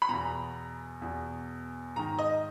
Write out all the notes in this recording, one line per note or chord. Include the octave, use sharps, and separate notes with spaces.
B5
E2 B2 A#5
E2 B2
G#2 D#3 A#5
D#5